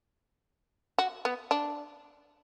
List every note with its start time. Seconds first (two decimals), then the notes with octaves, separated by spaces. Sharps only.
0.98 F#4
1.25 B3
1.51 D4